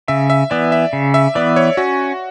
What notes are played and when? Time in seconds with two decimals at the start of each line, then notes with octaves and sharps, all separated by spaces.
0.08 C#3 E5
0.30 E5
0.51 E3 B3 D5
0.72 E5
0.93 C#3
1.14 E5
1.35 E3 B3 D5
1.56 C#5
1.77 C#4 F#4